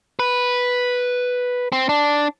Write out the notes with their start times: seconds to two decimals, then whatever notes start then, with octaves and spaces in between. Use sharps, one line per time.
0.19 B4
1.72 C4
1.89 D4